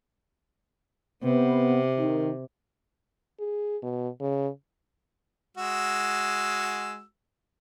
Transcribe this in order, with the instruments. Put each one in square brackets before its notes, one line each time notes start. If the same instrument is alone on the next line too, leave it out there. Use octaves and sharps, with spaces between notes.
[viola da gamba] C3 [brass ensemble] B3
[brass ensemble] D#3
[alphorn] G#4
B2
C#3
[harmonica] G#3 F#4 E6